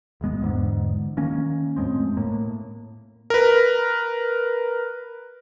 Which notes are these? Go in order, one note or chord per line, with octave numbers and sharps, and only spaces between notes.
D#1 G#1 G#3 B3
E2 G#2 D3
D#3 A#3 C#4
F2 A2 G#3 C4
A2 A#3
A#4 B4